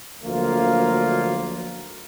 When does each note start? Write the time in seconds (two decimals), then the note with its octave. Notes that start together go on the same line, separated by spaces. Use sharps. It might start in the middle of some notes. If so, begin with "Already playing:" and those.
0.22 D2 F3 F#3 A#3 F4